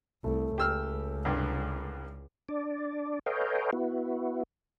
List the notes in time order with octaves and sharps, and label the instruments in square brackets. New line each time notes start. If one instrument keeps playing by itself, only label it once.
[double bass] C2 [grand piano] A3
[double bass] C#2 [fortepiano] G4 E6 F6
[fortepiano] C2 G2
[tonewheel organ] D4 D5
A4 B4 C#5 D#5 F5 G5
B3 E4 F#4